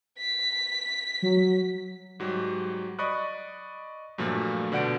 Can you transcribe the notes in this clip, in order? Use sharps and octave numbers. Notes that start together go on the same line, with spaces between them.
B6
F#3
G#2 F#3 G3
D5 D#5 B5 C#6 D#6 F#6
G2 A#2 F3 F#3 A3
B2 D3 D5 F#5 G6 D7